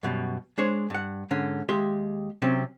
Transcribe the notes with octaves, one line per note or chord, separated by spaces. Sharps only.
F#2 B2 G3
G#3 D4 G#4 C5 C#5
G2 F#5
G#2 D3 C#4
D#2 G#3 G4 E5 C6
C3 F#3 C4 C#4